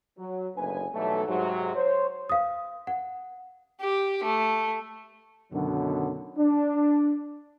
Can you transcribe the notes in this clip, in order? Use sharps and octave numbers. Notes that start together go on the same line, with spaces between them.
F#3
F#1 D2 A2 B3 B4 G#5
B1 B2 E3 F#3 G3 A3
G#2 C3 F#3
C5 C#5
F5 D#6
F#5
G4
A3
F#2 B2 D3 D#3 F#3 B3
D4